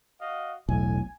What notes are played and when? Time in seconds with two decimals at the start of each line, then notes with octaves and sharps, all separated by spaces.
0.20 F#4 D#5 F5
0.69 E1 B1 A2 G#5